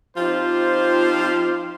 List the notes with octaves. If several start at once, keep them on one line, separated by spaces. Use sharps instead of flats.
F3 C4 D#4 F4 G4 C5